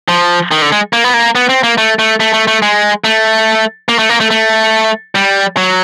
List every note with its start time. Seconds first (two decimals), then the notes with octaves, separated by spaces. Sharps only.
0.08 F3
0.51 D#3
0.62 D3
0.72 G#3
0.93 A#3
1.04 B3
1.14 A#3
1.35 B3
1.49 C4
1.63 A#3
1.78 A3
1.99 A3
2.20 A3
2.34 A3
2.48 A3
2.62 G#3
3.04 A3
3.89 A#3
3.99 A3
4.09 A#3
4.20 A3
4.31 A3
5.15 G3
5.57 F#3